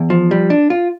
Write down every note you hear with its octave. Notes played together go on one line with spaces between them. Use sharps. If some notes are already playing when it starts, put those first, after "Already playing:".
Already playing: E2
F3
G3
D4
F4